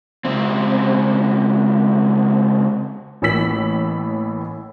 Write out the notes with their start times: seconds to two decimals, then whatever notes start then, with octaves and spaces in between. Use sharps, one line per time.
0.25 C#2 C4
3.22 A1 A2 A#3 E6 B6 F#7